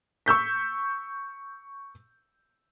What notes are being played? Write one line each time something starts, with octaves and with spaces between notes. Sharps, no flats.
C#6 E6 G6 B6